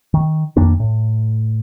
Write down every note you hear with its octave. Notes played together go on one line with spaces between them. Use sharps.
D#3
F2 D#3 A#3 D4
A2